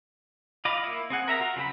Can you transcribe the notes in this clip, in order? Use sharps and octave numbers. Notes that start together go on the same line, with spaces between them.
F4 D#5 B5 D6
A#3 E4
C4 G#4 F#5
A#4 E5 A#5
F4 F#4
C#3 F#3 C4 B5